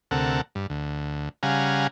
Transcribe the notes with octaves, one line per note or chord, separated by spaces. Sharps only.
D2 C3 A4 A#4 F#5
G2
D2
C#3 G3 F5 F#5 G#5 A#5